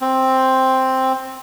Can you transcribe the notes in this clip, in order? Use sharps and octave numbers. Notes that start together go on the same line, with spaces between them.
C4